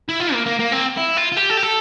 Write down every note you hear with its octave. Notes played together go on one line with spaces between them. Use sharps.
E4
F4
A#3
A#3
A#3
C4
E4
F4
F4
G4
A4
G4
A4